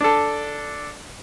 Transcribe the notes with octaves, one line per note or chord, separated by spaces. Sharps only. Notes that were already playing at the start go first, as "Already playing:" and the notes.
D4 A4